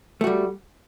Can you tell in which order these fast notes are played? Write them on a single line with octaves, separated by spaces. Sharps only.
A3 F#4 G3